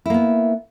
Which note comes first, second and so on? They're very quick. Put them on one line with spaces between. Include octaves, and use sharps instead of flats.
E4 A#3 B3